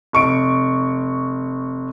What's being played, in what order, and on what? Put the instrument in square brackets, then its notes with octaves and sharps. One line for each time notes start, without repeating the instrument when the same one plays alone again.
[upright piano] F1 C#6 D7